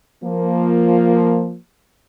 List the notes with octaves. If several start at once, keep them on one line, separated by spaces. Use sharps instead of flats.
F3 A#3